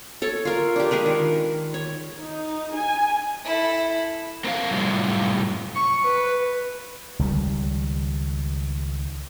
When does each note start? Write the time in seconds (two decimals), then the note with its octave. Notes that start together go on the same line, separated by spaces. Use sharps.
0.22 A4 C#5
0.45 F4 A#4
0.76 D4 G4
0.91 G#3 F4 A#4 B4
1.06 D#3
1.74 C#5
2.22 D#4
2.75 G#5
3.45 E4 A4
4.44 A#3 C4 F#4 F5
4.70 F#2 A2 C3 G3 F4
5.75 C#6
6.03 B4
7.19 C#2 D#3 G3